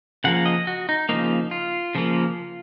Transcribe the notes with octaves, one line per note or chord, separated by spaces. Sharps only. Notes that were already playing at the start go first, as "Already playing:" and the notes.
C#3 F3 A#3 F#5
D#5
F#4
D#4
C#3 F3 A#3 D#4
F4
C#3 F3 A#3